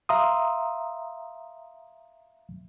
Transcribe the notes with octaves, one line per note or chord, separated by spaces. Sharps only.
E5 F5 A#5 C6 D#6